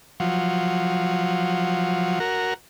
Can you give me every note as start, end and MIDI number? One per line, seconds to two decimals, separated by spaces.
0.20 2.19 53
0.20 2.19 54
2.20 2.54 66
2.20 2.54 70